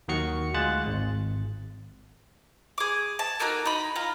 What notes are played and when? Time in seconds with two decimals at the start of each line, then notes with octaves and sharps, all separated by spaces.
0.08 D#2 D#3 F#3 F#4 C#6 C#7
0.54 D2 G#3 F4 G#4 F#6 A6
0.86 G#1
2.78 G#4 D6
3.19 A5
3.40 A3 A#3 D#4 F#4
3.65 D#4 B5
3.96 F4 A#5